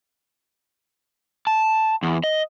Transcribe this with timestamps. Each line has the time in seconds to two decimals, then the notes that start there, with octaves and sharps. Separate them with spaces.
1.47 A5
2.03 E2
2.24 D#5